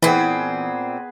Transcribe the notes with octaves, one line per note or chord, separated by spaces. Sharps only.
A#2 E3 B3 C4 G#4 B5